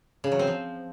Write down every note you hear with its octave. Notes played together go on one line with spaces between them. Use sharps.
C#3
F#3
C4
F3